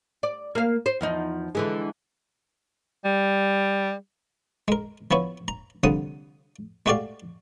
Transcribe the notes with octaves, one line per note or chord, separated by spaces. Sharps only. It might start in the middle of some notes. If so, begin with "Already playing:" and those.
D5
A#3 F5
C5
E2 F3 D#4
D3 E3 G#3
G3
G#3 A#4
F3 B3 E4 C#5
A#5
C2 D3 F3 F#5 D#6
G#3 A3 F#4 G4 D5 F5